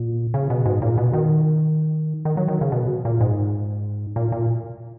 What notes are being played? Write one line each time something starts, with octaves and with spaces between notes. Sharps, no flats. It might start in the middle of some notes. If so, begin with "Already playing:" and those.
Already playing: A#2
C#3
B2
G#2
A#2
B2
D#3
D#3
F#3
D#3
C#3
B2
A#2
G#2
A#2
A#2